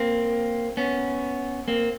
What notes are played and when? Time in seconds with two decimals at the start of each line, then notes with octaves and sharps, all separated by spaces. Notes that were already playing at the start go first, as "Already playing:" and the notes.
Already playing: A#3 C4
0.77 B3 C#4
1.68 A#3 C4